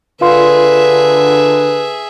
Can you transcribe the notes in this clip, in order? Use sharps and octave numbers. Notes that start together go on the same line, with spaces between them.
D3 F4 G#4 B4 E5 F5 C6